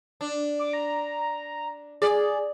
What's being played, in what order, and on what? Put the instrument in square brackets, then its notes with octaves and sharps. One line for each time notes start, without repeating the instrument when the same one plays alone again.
[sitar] D4
[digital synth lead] D6
A#5
[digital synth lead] G#4 [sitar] D5